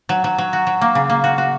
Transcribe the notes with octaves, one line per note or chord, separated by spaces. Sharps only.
F#3
F#3
F#3
F#4
F#3
A#3
C#3
A#3
F#4
F#4